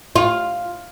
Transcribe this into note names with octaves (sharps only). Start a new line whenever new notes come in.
F4